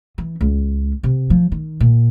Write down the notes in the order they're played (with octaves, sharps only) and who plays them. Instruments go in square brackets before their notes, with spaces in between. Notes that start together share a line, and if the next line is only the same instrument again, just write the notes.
[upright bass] E3
C#2
C3
F3
D#3
A#2